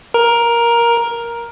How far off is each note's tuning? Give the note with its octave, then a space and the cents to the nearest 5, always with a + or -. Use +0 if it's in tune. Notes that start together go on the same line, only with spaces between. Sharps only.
A#4 +10